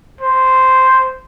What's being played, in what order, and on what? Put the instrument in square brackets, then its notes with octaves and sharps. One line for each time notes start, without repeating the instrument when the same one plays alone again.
[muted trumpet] C5